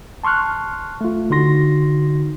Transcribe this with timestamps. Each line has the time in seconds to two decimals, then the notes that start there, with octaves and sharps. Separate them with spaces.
0.24 A5 C6 C#6 F6 F#6
1.01 A3 F4
1.30 D3 D#4 F#4 C6 A#6